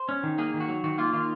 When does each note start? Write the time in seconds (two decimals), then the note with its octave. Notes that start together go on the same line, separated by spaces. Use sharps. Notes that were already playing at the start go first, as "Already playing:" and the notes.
Already playing: C5
0.09 C#4
0.23 D#3
0.38 A#3 G#4
0.54 D#3
0.60 F#4
0.69 F#3
0.84 D#3 F#4
0.98 A#3 F4
1.13 D#3 F4